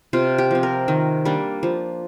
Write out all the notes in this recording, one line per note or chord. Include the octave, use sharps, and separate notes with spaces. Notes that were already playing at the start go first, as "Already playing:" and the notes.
C3 F4
G4
F3 C4
A#4
D#3
G3 A#3 D4
F3